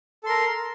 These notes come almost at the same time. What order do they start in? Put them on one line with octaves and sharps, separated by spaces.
A4 C6 A#4